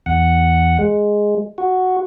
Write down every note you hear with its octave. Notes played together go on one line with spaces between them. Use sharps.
E2 F#5
G#3
F#4